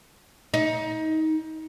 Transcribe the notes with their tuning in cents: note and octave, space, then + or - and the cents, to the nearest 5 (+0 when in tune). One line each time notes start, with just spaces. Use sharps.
D#4 +25